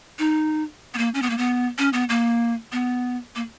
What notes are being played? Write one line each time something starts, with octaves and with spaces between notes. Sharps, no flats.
D#4
B3
A#3
C#4
B3
A#3
B3
C#4
B3
A#3
B3
A#3